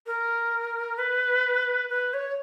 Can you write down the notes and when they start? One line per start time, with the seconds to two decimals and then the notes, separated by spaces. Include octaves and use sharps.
0.06 A#4
0.98 B4
1.89 B4
2.13 C#5